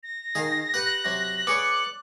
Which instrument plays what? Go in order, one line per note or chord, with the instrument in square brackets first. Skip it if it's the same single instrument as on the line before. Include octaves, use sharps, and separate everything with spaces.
[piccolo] A#6
[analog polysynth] D#3 [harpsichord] G#4 F5
[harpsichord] G4 B4 F#5 [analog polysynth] F#6
[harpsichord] C3 F#3
[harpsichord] B3 G#4 C#5 [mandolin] D5 [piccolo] C#7